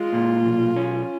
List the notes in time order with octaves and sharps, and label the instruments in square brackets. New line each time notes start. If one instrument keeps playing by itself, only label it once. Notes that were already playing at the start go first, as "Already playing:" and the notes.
Already playing: [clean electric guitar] G#3 [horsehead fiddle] F4
[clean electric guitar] A#2
B1
C#4